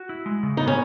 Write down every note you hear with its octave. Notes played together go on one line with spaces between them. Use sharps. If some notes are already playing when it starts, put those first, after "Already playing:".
Already playing: F#4
E4
G#3
C#3
B3 D#4
C#4